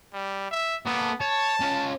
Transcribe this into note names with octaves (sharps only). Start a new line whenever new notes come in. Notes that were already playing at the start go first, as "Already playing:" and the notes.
G3
E5
A#3 B3 A4
C#5 A5
C#4 F4